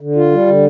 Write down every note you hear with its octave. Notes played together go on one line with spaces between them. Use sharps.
D3
F4
G3
D3